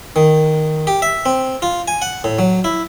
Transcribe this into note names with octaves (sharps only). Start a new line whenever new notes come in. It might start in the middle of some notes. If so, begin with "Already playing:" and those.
D#3
G4
E5
C4
F4
G#5
F#5
A2
F#3
E4